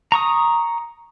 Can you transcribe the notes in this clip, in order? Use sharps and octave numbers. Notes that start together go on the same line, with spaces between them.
A#5 C#6 D#6